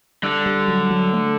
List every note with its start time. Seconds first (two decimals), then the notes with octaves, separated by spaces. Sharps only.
0.23 D3 G3
0.46 G3
0.68 F#3
0.91 F#3
1.13 A3